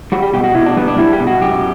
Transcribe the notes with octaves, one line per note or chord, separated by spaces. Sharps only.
G3 F#4
G4
B2 G4
F#4
B2 E4
D4
G3 B3
D4
G3 E4
G4
B2
F#4
F#2 G4